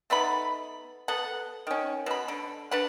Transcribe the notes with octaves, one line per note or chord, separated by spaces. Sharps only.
A3 B3 D#4 B5
B3 A4 F#5
D#3 C#4
B2 B5
D3
D4 B4 F#5